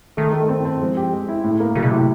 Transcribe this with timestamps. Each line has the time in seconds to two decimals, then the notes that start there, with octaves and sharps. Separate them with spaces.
0.17 D#3 A3
0.33 A3
0.49 C4
0.65 C4
0.81 F3 G#3
0.97 G4
1.13 G#3
1.28 E4
1.44 A2
1.60 A#3
1.75 C#3 F#3
1.83 B2
1.91 A2 C3